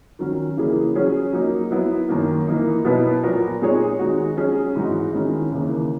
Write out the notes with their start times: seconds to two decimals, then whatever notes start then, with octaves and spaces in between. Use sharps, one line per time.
0.19 D#3 F#3 C#4
0.57 C#3 E3 A#3 E4 G#4
0.95 F#3 C#4 G#4 C#5
1.33 F#3 A#3 D#4
1.71 F#3 B3 E4
2.09 F#2 D#3 A#3
2.47 E3 A#3 D#4
2.85 B2 F#3 B3 E4 B4
3.23 A#2 F#3 B3 F#4 A#4
3.61 A#2 G#3 D#4 G#4 C#5
3.99 D#3 G#3 D#4 F#4
4.37 F#3 C#4 G#4
4.76 G#2 E3 G#3 D#4 F#4
5.13 D#3 G#3 C#4 E4
5.51 D#2 C#3 E3 A#3